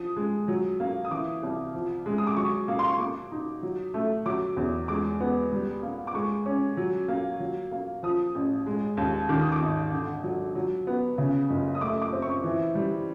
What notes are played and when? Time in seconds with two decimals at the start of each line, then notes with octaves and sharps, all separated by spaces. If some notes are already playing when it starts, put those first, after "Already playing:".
Already playing: F3 D#6
0.16 G#3
0.48 F#3
0.80 A#3
1.05 D#6
1.11 E3 D6
1.43 C2
1.75 F3
2.06 G#3
2.18 D#6
2.27 D6
2.37 F#3 C#6
2.68 A#3
2.79 C6
2.89 C#6
2.99 A#3 D6
3.32 D#4
3.63 F#3
3.94 A3
4.26 F#3 D6
4.57 E2
4.88 G#3 D6
5.20 B3
5.52 G3
5.82 A#3
6.07 D6
6.15 G#3 C#6
6.46 C#4
6.77 F#3
7.08 A#3
7.40 F#3
7.71 A#3
8.03 F3 D#6
8.35 A1
8.66 G#3
8.97 D#2
9.29 D#3 D6
9.41 D#6
9.52 D6
9.61 G#1
9.91 D3
10.23 F#3
10.55 F#3
10.87 B3
11.18 C#3
11.50 F#1
11.75 D#6
11.81 A3 D6
12.02 D6
12.13 C4
12.22 C#6
12.44 E3
12.75 G3